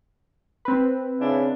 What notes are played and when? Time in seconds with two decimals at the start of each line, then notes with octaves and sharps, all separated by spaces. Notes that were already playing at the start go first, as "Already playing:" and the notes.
0.65 C4 B4
1.19 C#3 D4 E4